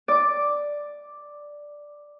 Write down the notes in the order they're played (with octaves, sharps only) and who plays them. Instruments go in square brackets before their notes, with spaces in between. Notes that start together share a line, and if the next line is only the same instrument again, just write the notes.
[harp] D5 D6